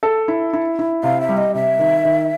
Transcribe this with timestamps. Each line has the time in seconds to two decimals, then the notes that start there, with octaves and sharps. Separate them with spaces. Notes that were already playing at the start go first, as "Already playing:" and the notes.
0.03 A4
0.28 E4
0.53 E4
0.79 E4
1.03 C3 F5
1.21 E5
1.29 G3
1.37 D#5
1.54 C3 E5
1.79 D#3
2.05 D#3